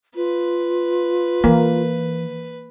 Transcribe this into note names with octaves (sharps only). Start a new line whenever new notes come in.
F4 B4
E3 A#3